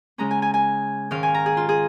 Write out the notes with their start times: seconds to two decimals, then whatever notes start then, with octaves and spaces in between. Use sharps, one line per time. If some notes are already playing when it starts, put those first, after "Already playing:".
0.18 C#3 G#3 C#4 A#5
0.31 G#5
0.42 G#5
0.54 G#5
1.11 G#2 D#3 C#4 F5
1.23 G#5
1.34 A#5
1.46 G#4
1.57 F4
1.69 G#4